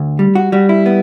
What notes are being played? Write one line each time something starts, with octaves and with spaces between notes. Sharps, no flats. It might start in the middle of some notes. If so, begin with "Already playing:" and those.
Already playing: D2
G3
F#4
G3 F#4
E4
B3